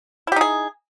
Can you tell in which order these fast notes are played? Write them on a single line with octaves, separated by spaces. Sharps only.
E4 G4 D#4 G#4